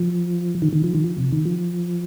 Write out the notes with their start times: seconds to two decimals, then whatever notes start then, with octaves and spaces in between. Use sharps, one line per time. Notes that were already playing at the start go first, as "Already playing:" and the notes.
Already playing: F3
0.62 D#3
0.73 D#3
0.84 F3
0.95 D#3
1.04 F3
1.18 C3
1.32 D#3
1.45 F3